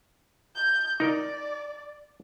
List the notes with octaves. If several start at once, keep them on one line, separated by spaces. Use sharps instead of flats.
G6
D#4 A#4 D5